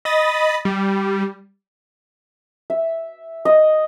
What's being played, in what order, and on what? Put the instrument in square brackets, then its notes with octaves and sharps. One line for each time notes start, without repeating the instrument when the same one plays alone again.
[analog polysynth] D#5 B5 D#6 A6
G3
[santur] E5
D#5